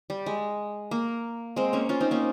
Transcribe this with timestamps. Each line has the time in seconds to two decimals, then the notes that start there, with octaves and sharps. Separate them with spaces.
0.10 G3
0.26 G#3
0.91 A#3
1.56 G#3 C4
1.73 A#3 C#4
1.89 C#4 F4
2.00 C4 D#4
2.11 A#3 C#4